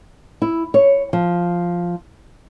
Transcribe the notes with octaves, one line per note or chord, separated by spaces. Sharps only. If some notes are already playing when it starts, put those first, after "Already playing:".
E4
C#5
F3